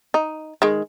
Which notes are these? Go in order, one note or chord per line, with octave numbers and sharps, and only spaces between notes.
D#4
D#3 G#3